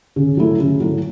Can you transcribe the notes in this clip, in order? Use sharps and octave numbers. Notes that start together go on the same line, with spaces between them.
C#3
F#3 A3 E4
C#3
F#3 A3 E4